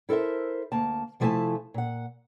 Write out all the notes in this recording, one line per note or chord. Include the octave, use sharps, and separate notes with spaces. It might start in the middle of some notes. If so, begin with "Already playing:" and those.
E4 A4 A#4 C5 E5
D2 A#3 A5
C3 F3 A3 E4 G#5 A5
A#2 F#5